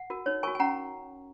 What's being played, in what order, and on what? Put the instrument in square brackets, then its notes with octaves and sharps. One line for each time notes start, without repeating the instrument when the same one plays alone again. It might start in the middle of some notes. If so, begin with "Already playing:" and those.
Already playing: [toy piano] F#5
F#4 A#4
D#4 C#5
F#4 A#4 G#5 C#6
G#5
C#4 F#5 A#5